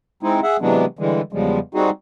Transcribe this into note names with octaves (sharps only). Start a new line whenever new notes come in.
G#3 C4 D#4 E4
G#4 E5 F#5
C3 E3 F#3 G#3 B3 D4
D3 E3 G3 G#3
E2 C#3 F3 G3 G#3
G3 C4 D#4 F#4 G#4